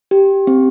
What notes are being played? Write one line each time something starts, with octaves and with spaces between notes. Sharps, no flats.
G4
C4